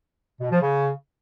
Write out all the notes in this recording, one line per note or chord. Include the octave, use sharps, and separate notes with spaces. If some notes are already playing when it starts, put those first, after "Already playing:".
B2
F3
C#3